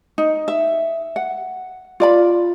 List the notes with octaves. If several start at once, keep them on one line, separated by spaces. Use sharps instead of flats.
D#4
E5
F#5
F4 D5 B5